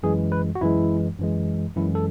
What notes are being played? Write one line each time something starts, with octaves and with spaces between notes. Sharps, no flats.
F#2 E3 G#3 G#4
B4
F#4
F#2 E3 G#3 E4
F#2 E3 G#3
F#2 E3 G#3 E4
A4